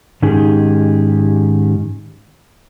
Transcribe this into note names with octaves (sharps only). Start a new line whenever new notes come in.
G#2 D#3 C#4 D#4 G4 G#4